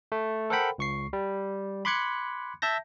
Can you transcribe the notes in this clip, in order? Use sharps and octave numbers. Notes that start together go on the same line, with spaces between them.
A3
A4 A#4 C5 F#5 G5 B5
C#2 C#6 C7
G3
B5 C6 D6 F#6 G#6 C#7
E5 A5 G6 A#6